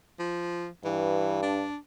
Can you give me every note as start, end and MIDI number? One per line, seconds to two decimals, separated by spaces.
0.19 0.68 53
0.85 1.66 43
0.85 1.39 52
1.42 1.77 62